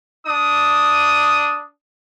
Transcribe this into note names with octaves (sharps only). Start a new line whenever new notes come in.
D4 D#6